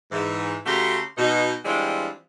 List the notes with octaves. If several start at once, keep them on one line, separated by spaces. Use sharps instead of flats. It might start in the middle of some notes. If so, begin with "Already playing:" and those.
G#2 E3
C#3 A3 F#4 G4 A#5 C6
B2 D#4
E3 G3 G#3 C4 D4 F4